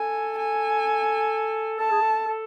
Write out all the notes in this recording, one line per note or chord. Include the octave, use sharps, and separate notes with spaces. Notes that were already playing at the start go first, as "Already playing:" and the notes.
Already playing: A4 G#5
G#5
A4 A5
G#4
A4
A4